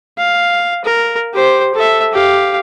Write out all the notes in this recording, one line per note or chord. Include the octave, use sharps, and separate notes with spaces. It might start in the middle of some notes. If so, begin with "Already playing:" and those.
F5
A#4
G4 C5
A4 E5
G4 F5